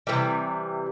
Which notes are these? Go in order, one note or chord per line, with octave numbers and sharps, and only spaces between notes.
C3 E3 G3